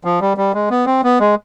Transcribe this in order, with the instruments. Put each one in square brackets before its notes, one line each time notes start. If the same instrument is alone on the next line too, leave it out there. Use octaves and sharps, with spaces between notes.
[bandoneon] F3
G3
G3
G#3
B3
C4
B3
G#3